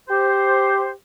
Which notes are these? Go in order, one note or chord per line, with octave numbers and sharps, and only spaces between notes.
G4 C5